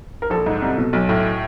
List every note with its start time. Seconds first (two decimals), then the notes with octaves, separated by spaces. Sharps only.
0.22 A#4
0.30 A#1 A4
0.46 G#2
0.62 C2
0.78 B2
0.93 B1
1.09 A2